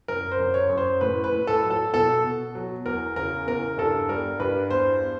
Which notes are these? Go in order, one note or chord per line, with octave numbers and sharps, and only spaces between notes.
F#2 A#4
C5
F#2
C#5
F#2
C5
A2 B4
B4
A2
A4
F#3
A4
B2 A4
B2
F#3
E2 A#4
C#3 A#4
E2 A#4
G2 A4
G3 A#4
G2 B4
E2 C5